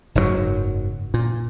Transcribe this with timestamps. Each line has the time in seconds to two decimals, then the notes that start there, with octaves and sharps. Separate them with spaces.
0.15 F#1 G#2 B2 F#3
1.14 A#2